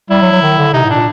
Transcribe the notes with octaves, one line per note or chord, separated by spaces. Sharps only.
G3 E4
F#3
F#3
D#3
D3
C3 D#4
A2
A#2 D4